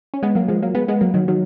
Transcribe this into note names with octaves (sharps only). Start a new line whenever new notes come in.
C#4
G#3 B3
F#3 A#3
F3 G#3
F#3 A#3
G#3 B3
G#3 B3
F#3 A#3
D#3 F#3
D#3 F#3